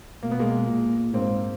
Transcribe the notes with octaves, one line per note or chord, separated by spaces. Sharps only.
B2 A#3
B3
G#3 A#3
A#2
G#2 A#3 C4